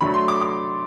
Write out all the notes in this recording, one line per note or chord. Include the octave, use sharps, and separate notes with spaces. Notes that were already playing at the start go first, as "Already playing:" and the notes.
D3 F#3 A3 B5
C6
D6
D6